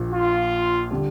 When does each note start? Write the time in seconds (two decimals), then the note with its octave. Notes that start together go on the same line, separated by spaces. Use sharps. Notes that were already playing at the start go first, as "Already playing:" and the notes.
Already playing: A#1 A#2 F3
0.13 F4
0.91 D3 G3 D4 G4